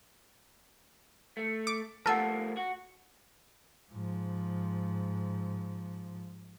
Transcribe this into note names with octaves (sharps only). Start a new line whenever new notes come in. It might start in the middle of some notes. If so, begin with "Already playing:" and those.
A3
D6
F3 A3 A#3 A4 A#4 F#5 A5
F#4
G#2 F3